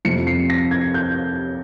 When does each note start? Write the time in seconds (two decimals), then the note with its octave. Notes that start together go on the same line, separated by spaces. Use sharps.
0.05 F2 C3 F3 C#7
0.27 C7
0.50 A#6
0.71 G#6
0.94 G6